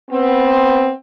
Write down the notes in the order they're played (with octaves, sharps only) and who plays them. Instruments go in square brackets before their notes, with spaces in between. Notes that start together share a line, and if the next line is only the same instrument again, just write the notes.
[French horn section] B3 C4